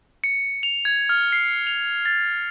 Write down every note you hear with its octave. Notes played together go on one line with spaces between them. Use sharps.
C#7
F7
G#6
F6
C7
F7
A6